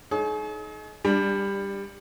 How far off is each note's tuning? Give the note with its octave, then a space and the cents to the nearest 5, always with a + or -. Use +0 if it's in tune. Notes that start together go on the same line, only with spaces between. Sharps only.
D#4 +5 G#4 +40 C#5 +0
G3 +15 D4 +0